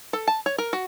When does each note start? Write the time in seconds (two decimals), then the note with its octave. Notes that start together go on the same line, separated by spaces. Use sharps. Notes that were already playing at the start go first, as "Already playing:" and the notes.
0.13 A4
0.28 A5
0.46 C#5
0.58 A#4
0.73 F#4